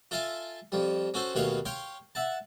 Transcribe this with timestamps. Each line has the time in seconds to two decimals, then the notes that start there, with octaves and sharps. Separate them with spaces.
0.11 F4 A4 E5 F5 G#5 A5
0.72 F2 F3 G3
1.14 C#4 F#4 A4 C5
1.35 D#2 B2 A3 B4 C#5 F5
1.65 C#5 F5 G5 C6
2.15 E5 F#5 A5